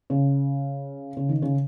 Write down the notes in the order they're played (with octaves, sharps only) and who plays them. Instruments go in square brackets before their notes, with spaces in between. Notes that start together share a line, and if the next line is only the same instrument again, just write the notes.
[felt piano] C#3
C#3
D#3
C#3